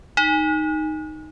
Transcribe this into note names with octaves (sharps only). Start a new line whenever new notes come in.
D#4